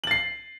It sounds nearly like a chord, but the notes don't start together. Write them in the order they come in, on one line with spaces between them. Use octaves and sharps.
F#7 A6 C7